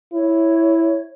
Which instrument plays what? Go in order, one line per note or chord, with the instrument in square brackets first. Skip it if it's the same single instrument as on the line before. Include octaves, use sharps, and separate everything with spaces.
[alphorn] E4 [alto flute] C#5